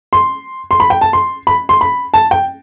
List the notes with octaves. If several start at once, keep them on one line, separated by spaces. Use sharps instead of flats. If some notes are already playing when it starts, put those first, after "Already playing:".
C6
C6
B5
G5
A5
C6
B5
C6
B5
A5
G5